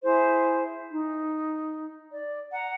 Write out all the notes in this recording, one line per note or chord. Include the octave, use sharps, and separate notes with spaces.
E4 G#4 C5
D#4
D5
F#5 A#5